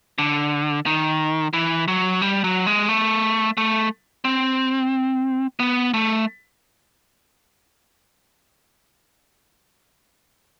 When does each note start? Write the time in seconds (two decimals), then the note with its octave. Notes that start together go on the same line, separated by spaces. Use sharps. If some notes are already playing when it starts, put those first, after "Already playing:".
0.18 D3
0.86 D#3
1.54 E3
1.88 F#3
2.22 G3
2.44 F#3
2.67 G#3
2.89 A3
3.57 A3
4.25 C4
5.60 B3
5.94 A3